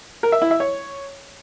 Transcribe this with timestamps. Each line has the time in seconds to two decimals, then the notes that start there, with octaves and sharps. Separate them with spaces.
0.23 A#4
0.32 E5
0.42 E4
0.51 E5
0.60 C#5